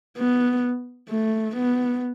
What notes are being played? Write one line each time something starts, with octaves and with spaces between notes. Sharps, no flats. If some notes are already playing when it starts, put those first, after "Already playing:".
B3
A3
B3